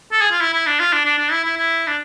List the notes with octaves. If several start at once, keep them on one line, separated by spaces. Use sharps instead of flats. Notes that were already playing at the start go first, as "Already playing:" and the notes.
A4
G#4
F4
E4
E4
D4
F4
D4
D4
D4
E4
E4
E4
D4